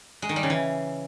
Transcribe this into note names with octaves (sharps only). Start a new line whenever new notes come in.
G#3
D#3
G3
C#3
E3